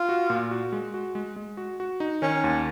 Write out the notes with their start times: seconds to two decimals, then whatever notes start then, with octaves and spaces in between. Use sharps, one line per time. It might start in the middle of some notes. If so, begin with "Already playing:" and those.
Already playing: F4
0.09 F#4
0.30 A#2
0.51 F#4
0.72 G#3
0.94 F#4
1.15 G#3
1.36 G#3
1.57 F#4
1.80 F#4
2.00 D#4
2.22 D#3 C#4
2.44 D#2